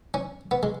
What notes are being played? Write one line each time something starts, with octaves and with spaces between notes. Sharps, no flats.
C#4
B3
G#3